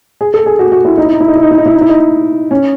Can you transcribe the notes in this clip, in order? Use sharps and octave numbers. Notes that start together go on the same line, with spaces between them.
G#4
A4
G#4
F#4
F#4
E4
D#4
E4
D#4
E4
D#4
E4
D#4
E4
D#4
E4
D#4
E4
D#4
C#4